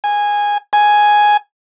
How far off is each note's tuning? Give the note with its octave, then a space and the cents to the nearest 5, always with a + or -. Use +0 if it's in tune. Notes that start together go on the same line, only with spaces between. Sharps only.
G#5 -10
G#5 +5